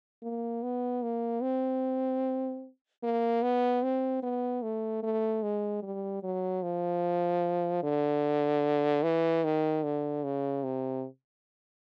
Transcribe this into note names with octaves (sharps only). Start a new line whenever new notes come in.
A#3
B3
A#3
C4
A#3
B3
C4
B3
A3
A3
G#3
G3
F#3
F3
D3
E3
D#3
D3
C#3
C3